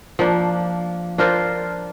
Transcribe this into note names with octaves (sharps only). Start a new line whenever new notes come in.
F3 A#3 D4
D4 F4 A#4 C5